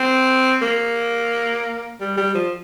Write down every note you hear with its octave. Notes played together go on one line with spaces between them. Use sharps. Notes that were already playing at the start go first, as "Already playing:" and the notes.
Already playing: C4
A#3
G3
G3
F3